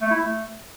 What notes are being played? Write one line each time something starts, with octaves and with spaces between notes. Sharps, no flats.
A3
E4
A3